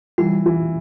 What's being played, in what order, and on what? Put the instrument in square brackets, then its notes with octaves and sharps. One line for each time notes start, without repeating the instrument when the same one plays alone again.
[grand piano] E3 [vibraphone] G3
[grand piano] E3